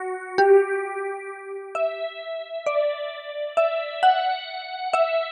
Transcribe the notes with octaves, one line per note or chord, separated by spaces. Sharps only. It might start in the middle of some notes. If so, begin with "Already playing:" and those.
Already playing: F#4
G4
E5
D5
E5
F#5
E5